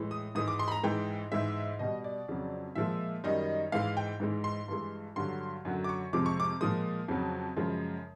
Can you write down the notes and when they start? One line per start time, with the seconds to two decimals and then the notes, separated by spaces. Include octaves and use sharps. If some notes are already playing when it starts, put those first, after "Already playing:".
Already playing: A2 E3 G#3
0.11 D#6
0.35 G#2 E3 G#3 D#6
0.48 D6
0.59 C6
0.68 B5
0.72 A#5
0.83 G#2 E3 G#3 G5
1.32 G#2 E3 G#3 E5
1.79 B2 G3 D#5
2.04 D5
2.29 F2 C#3 F#3
2.75 A#2 F3 G#3 E5
3.24 F#2 D#3 G3 D#5
3.72 G#2 E3 G#3 F5
3.97 G5
4.20 G#2 E3 G#3
4.44 C6
4.68 G2 E3 G#3
5.16 G2 D3 F#3 C6
5.65 F#2 D3 F#3
5.84 D6
5.89 C#6
6.13 F2 C3 F3 G#3 D6
6.26 C#6
6.40 D6
6.61 A#2 F3 G#3 D#6
7.08 F2 C#3 F#3
7.57 F#2 C#3 F3 G#3